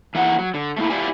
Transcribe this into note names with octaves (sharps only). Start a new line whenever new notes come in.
E3 A#3 F#5
F#3
D3
A3 A#3 E4
E4 F4 G4 B4 D5 G#5